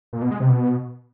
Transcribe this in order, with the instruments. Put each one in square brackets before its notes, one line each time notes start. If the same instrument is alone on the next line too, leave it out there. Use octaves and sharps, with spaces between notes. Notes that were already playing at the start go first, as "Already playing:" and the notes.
[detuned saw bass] A#2
B2
G#3
C3
B2